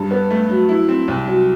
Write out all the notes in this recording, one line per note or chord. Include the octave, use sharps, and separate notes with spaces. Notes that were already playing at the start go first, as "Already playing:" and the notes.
Already playing: G2 G3
B3
A3
F#3
E4
C4
C2
F#3